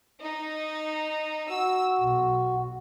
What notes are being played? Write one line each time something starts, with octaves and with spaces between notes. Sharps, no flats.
D#4
F#4 E6
B1